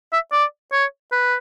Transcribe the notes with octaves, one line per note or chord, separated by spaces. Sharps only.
E5
D5
C#5
B4